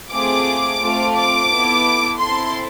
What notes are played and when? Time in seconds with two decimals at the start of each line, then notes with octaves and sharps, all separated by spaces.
0.11 A3 C4 F4 G#4 D6
0.80 A3 C4 F4 A4
1.15 D6
1.50 B3 E4 A4
2.19 C4 E4 A4 C6